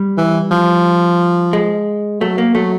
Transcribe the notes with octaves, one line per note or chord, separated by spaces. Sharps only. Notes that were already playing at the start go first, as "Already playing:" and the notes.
Already playing: G3
E3
F3
G#3
F#3 A3
A#3
F#3 A3